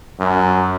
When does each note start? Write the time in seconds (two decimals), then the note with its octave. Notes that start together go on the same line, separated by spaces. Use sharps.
0.20 F#2